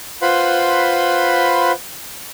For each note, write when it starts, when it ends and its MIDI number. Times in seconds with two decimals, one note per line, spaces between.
0.22 1.72 65
0.22 1.72 71
0.22 1.72 72
0.22 1.72 78
0.22 1.72 83
0.22 1.72 84